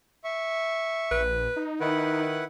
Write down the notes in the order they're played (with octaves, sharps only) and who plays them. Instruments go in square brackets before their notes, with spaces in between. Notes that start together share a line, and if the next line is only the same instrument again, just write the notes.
[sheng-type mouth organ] E5 C#6
[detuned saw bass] A#1 [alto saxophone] B4
[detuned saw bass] D#4
[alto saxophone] D#3 [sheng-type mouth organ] E4 B4 F#5